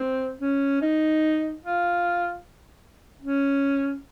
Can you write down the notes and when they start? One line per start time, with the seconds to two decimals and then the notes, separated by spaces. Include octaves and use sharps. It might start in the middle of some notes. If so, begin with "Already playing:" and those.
Already playing: C4
0.41 C#4
0.81 D#4
1.62 F4
3.22 C#4